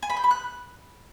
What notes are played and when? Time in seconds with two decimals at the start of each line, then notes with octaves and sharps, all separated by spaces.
0.03 G#5
0.10 B5
0.17 G6
0.24 B5
0.31 F#6